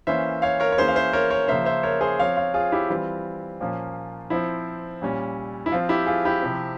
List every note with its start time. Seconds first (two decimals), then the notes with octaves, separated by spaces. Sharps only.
0.07 E3 A#3 C#4 C5 E5
0.42 C#5 F5
0.60 A#4 C#5
0.72 C#5
0.78 E3 A#3 C#4 G#4 C5
0.88 F5
0.95 C5 E5
1.13 A#4 C#5
1.30 A#4 C#5
1.48 C#3 F3 A#3 C#4 C5 E5
1.65 C5 E5
1.83 A#4 C#5
2.01 G#4 C5
2.19 F3 C4 C#5 F5
2.36 C#5 F5
2.54 F4 G#4
2.72 E4 G4
2.89 E3 G3 C4 F4
3.60 A#2 F3 A#3 C#4
4.30 F3 C4 E4
5.02 A#2 G3 C#4
5.66 E4
5.72 F3 C4 F4
5.89 E4 G4
6.06 F4 G#4
6.25 E4 G4
6.42 C3 F3 C4